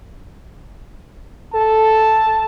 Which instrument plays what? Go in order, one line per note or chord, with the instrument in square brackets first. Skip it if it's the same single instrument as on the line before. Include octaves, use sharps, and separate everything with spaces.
[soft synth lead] A4 [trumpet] A5